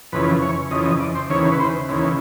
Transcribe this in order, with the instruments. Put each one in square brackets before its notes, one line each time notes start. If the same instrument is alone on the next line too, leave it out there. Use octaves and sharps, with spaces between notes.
[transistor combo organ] F2 C#3 E3 B4
C#5
F2 C#3 E3 D#5
D#5
D5
C5
D#2 C#3 E3 C#5
B4
C5
D#2 C#3 E3